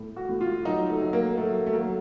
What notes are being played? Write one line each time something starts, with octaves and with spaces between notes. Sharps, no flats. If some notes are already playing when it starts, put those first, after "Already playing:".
Already playing: A2
F#4
A2
F4
F#3 D#4
A3
F#3
A#3
F#3 A3
A3
F#3 A#3